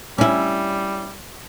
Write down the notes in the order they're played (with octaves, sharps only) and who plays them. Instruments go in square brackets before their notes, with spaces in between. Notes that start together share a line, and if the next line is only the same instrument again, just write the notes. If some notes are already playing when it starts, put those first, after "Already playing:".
[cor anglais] G3 [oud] C#4 E4